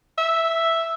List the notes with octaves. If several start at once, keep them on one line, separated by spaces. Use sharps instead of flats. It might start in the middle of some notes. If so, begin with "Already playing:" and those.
E5